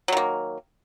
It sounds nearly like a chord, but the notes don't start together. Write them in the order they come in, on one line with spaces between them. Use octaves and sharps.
F#3 D#3 A#3